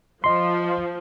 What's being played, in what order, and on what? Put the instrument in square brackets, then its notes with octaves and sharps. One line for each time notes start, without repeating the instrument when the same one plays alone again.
[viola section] F3 [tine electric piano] D#5 C6